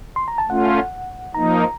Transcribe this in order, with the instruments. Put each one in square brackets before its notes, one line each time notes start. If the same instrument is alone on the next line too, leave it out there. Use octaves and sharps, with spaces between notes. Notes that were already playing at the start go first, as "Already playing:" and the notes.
[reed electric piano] C6
A#5
A5
[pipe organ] A3 C#4 F4 [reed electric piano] F#5
[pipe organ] F3 A#3 D#4 [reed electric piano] A#5